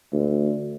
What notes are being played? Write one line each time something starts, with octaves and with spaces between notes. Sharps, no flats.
D2